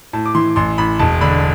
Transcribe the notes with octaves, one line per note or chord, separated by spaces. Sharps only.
A2 A5
D6
E3 C6
A1 C6
A1 B5
E1 A5
D3 B5